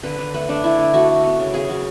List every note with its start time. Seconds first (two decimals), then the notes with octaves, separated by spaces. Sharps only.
0.03 D3 B4
0.19 D3
0.34 A3 B4
0.49 A3 D4
0.64 D3 E4
0.78 D3
0.94 A3 F#4
1.09 A3
1.23 B3
1.39 C#3
1.54 C#3 G#4
1.69 F#3